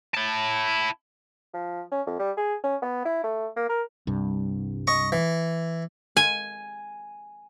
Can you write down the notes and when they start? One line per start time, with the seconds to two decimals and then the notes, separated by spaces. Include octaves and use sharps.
0.15 E4 A5
1.54 F3
1.92 C#4
2.07 F2
2.19 G3
2.37 G#4
2.63 C#4
2.82 B3
3.05 E4
3.24 A3
3.56 A#3
3.69 A#4
4.07 C2 G2
4.87 D#5 C#6
5.12 E3
6.17 G#5